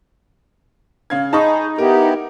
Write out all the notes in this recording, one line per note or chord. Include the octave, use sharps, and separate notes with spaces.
C#3 F5 G#6
D#4 G#4 A5 B5 C#6
B3 E4 G4 A#4